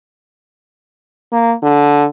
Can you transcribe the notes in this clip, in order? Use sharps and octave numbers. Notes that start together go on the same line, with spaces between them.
A#3
D3